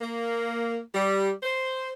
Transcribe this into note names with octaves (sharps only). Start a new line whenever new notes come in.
A#3
G3
C5